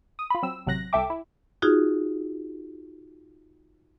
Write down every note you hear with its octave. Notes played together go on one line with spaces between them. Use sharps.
D#6
F4 B5
F#3 C4 E6
A1 C3 F#3 F#6 A#6
C2 A4 E5 G5 D6
E4
D#4 F4 F#4 G#4